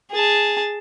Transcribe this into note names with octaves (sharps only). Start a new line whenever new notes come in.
G#4 A5